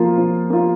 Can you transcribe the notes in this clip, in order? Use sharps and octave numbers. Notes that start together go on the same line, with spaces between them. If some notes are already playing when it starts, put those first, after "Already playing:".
Already playing: F3 A#3 F4
F3
A#3 F4